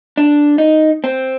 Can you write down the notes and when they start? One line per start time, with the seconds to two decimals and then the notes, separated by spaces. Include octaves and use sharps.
0.17 D4
0.58 D#4
1.04 C4